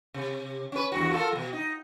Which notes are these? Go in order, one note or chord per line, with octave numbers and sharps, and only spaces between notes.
C3
C#4 B4
E2 G2 F#4
F4 A4 A#4
B2 F#3
D#4